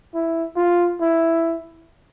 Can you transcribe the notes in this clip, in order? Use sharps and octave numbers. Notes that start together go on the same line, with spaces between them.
E4
F4
E4